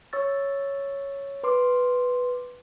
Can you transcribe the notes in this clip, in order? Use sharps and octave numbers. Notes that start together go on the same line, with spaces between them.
C#5 C#6 E6 A6
B4 C6 D6